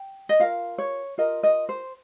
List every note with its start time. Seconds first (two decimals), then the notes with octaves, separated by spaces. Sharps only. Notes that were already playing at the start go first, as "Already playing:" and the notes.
Already playing: G5
0.29 D#5
0.40 F4 A#4 F5
0.78 C#5
1.18 F4 A#4 D#5
1.43 D#5
1.69 C5